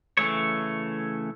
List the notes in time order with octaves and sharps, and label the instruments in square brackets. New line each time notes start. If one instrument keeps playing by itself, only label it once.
[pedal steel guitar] C#3 E3 A3 C#5